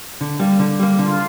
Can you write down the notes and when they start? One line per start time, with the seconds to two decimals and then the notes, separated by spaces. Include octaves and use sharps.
0.21 D3
0.40 G3 A#3
0.59 D3
0.80 G3 A#3
0.99 D3 F4